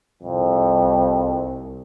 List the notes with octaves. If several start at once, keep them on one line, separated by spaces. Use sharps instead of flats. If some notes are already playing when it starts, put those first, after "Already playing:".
C2 F2